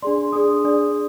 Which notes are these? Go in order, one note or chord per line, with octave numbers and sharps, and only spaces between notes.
D4 G#4 D5 C6
D4 G#4 D5 D#6
D4 G#4 D5